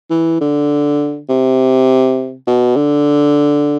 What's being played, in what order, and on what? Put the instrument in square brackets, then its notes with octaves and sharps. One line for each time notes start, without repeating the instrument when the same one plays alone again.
[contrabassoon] E3
D3
C3
B2
D3